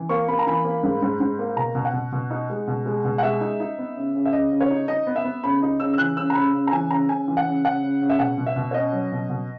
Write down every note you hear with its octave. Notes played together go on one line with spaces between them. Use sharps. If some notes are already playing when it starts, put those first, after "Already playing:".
Already playing: E3
A#3 C#6
A#3 B5
A#5
E3 B5
A#3
G#2
G#2
G#2
A#3
B2 A#5
B2
F#5
B2
B2
D#4
G#3
B2
G#3
B2
F#5
G#3 E5
D#4
D#4
B3
C#3
C#3
E5
C#3 D#5
C#3
C#5
D#4
D#4 D#5
B3
E5
B3
C#3 B5
D#4
C#3 E6
E6
E3 F#6
C#3 E6
A#5
C#3 B5
C#3
A#5
E3 G#5
C#3 A#5
C#3 G#5
E3
F#5
C#3
C#3 F#5
C#3
C#3
E5
B2 F#5
B2
E5
B2
C#5
C#4 D#5
F#3
B2
B2